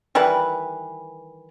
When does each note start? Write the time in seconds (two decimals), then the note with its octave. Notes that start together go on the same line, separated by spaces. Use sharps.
0.15 D#3 E3 G3 B4